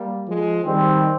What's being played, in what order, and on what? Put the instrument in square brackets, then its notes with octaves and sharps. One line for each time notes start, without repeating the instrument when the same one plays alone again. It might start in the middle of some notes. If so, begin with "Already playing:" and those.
Already playing: [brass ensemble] G3 A#3
F3 G#3
[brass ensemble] D#3 G3 [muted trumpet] C4